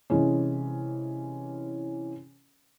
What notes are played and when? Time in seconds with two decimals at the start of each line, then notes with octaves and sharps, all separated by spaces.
0.10 C3 E3 G#3 C#4